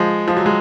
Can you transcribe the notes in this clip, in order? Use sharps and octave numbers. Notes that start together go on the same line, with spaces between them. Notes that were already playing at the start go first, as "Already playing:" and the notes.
Already playing: F3 G#3
F3
F#3
G#3